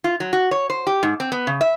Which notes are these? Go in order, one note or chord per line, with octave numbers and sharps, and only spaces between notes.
F4
F#3
F#4
C#5
C5
G4
G#2
C4
B3
C#3
E5